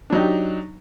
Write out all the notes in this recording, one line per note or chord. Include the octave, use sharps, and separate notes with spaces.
F#3 D4 D#4 G4